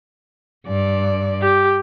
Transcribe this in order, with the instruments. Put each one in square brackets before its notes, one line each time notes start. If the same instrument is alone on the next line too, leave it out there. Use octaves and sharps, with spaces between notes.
[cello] G2 D5
[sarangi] G4